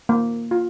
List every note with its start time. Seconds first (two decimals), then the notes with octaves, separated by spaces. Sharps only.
0.09 A#3
0.51 F4